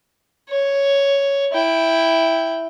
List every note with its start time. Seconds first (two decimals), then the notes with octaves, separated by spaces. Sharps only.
0.50 C#5
1.53 E4 G5